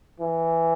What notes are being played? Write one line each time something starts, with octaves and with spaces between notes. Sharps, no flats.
E3